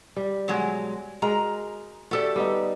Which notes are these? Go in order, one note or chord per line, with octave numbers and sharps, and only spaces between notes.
G3
B2 F#3 G#3
G#3 F#4 A#4 A#5
A3 F#4 G4 A4 D5
G3 B3 D#4